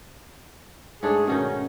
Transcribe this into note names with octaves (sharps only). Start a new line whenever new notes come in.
G#2 A3 D4 G#4
B2 D#3 C#4 D#4